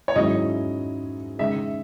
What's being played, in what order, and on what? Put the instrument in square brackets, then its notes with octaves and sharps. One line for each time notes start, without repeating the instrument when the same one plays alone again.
[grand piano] C#5
G#2 F#3 C#4 E4 D#5
C#3 G#3 D#4 E5